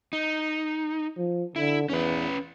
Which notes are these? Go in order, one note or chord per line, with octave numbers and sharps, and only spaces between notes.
D#4
F3
D3 E4
E2 C#4 B4